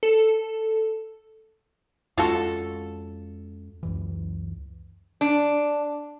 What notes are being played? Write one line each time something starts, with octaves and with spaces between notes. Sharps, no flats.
A4
F2 G#3 C#4 F4 F#4 A4
C#2 F#2 E3
D4